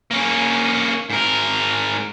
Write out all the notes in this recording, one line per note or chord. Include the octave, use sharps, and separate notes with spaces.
A#3 C#4
G#2 A#4